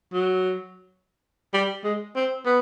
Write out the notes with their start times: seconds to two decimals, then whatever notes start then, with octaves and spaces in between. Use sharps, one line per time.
0.13 F#3
1.53 G3
1.84 G#3
2.15 C4
2.46 B3